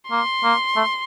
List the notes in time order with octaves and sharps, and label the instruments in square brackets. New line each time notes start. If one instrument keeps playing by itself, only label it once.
[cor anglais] A#3 [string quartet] C6
[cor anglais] A#3
A3